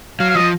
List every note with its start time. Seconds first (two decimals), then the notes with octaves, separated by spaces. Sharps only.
0.20 F#3 F5
0.30 F5
0.35 F3 D#5